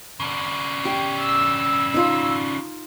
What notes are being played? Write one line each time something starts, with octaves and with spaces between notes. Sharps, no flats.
C#3 D4
G4
E6
D#4 F4